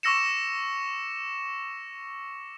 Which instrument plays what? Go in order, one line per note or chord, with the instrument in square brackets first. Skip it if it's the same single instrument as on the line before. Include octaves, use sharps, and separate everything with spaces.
[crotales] C#6 D6 E6 A#6 C#7 E7